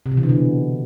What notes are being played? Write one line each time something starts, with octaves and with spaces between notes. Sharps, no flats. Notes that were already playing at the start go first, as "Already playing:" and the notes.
C3
B2
E3
D3
B2